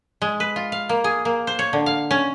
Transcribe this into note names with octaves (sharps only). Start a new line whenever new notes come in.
G#3
B4
F4
F5
A#3
G#4
A#3
C5
C#5
D3
F5
C#4